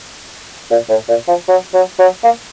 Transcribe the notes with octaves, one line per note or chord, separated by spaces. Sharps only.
A#2
A2
A#2
F3
F#3
F#3
F#3
A#3